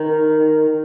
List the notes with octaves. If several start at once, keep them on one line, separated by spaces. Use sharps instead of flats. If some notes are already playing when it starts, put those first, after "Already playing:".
Already playing: D#3